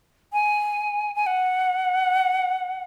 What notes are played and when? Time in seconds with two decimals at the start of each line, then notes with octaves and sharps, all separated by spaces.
0.33 G#5
1.15 G#5
1.26 F#5